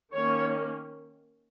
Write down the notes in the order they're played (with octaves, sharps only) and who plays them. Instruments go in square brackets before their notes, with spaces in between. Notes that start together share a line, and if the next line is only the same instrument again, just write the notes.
[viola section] D#3 A#3 C#4 C#5